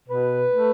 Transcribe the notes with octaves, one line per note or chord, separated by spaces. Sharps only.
B2 B4
A3